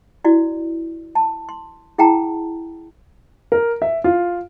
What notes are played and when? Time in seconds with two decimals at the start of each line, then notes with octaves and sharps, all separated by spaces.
0.24 E4 F#4 D5
1.15 A5
1.49 C6
1.98 E4 G#4 F#5 G5 A5 A#5
3.52 A#4
3.82 E5
4.04 F4